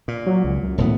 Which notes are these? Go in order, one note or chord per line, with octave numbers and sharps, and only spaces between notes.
A#2
F#3
C#2
F#2
D#1 A2 B3